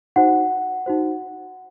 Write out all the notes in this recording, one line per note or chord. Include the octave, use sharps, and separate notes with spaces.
D#4 F#4 C5 F#5
D#4 F#4 C5